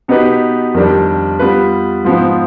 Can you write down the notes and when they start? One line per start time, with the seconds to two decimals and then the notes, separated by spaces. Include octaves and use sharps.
0.08 B2 B3 D#4 G4 B4
0.74 F2 D#3 G3 D4
1.39 G3 B3 F4 B4
2.05 G#2 F3 B3